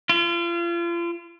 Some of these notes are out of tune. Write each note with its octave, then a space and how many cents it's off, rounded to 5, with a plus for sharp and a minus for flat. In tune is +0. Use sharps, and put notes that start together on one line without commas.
F4 -35